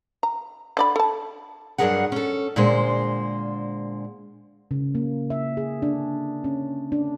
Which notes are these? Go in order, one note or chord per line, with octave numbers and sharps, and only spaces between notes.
A#5
D3 D5 B5
A4 A5
G2 F#3 D4 G#4 A#4 F#5
C#4 A4
A#2 D3 G#3 C5
C#3
A#3
E5
G#4
D4
C#4
D4